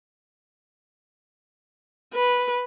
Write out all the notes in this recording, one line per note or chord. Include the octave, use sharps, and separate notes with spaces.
B4